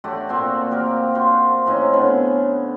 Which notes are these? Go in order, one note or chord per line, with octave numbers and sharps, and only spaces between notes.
A3 F#4 G4 D5
A#2 C4 F#4
F#4 G4 A#4 F5
F4 F#4 C5
A2 C4 C#4 D#4
D3 B3 C#4